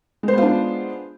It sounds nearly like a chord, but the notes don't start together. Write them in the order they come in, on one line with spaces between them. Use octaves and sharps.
G#3 C5 B3 F4 D4